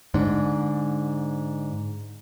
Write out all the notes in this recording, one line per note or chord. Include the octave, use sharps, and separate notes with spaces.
G#2 D3